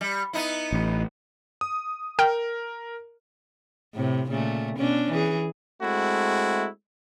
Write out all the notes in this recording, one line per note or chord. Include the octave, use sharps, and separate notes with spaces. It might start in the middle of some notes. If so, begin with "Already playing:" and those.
G3
B3 D#4 E4
A1
D#6
A#4 G5 F6
A2 C3
A#2 C#3 A3
B2 C#4 D4
E3 G#4
G#3 A3 C4 E4 F#4